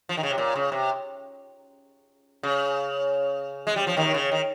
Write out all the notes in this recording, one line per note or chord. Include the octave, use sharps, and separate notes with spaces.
F3
D#3
C#3
C3
A#2
C#3
C3
C#3
G#3
G3
F3
D#2 D#3
C#3
D#3